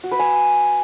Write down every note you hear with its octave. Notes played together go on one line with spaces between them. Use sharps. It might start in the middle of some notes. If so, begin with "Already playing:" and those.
F#4
B4
G#5